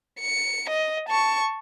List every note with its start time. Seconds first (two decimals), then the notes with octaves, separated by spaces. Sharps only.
0.20 C#7
0.69 D#5
1.09 A5 C#6